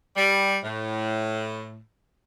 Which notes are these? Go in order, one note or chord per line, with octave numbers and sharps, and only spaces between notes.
G3
A2